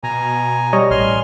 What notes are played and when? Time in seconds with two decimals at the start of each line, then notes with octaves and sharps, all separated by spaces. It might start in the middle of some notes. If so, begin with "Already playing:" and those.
0.04 B2 G#5 A#5
0.73 G3 C#5 D#5
0.91 A1 G#5 C6 F6